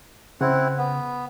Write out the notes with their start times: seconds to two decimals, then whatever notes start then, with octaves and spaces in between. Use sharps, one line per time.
0.41 C#3 C4 E4 F#5
0.78 B3